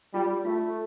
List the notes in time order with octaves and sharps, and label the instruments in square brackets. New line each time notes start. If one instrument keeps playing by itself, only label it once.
[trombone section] G3 [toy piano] F4
[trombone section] A3 [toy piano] F4